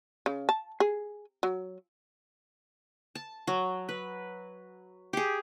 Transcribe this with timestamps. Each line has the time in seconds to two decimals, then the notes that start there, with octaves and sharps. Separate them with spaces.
0.26 C#3
0.49 A5
0.80 G#4
1.43 F#3
3.15 A5
3.47 F#3
3.89 B4
5.13 G4 G#4